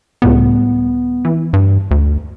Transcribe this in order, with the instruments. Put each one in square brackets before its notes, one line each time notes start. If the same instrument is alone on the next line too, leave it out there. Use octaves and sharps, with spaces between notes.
[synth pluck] C#2 A2 G3 [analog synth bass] B3
[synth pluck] E3
[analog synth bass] G2
D2